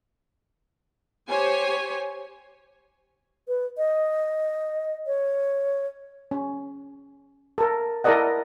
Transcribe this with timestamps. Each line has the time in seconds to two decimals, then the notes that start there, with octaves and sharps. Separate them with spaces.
1.28 G4 C5 C#5 G#5
3.48 B4
3.77 D#5
5.07 C#5
6.31 C#4
7.58 A4 A#4
8.04 E4 A4 A#4 D5 D#5 F#5